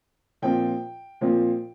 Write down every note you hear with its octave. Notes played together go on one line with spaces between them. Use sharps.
A#2 F3 C4 F4 G5
A#2 F3 C4 F4